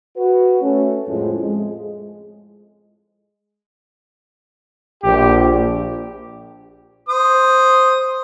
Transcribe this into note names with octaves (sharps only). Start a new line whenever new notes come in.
F#4 B4
A3 C#4
F2 A2 F3 G#3
G#3
A#1 G4
C5 D#6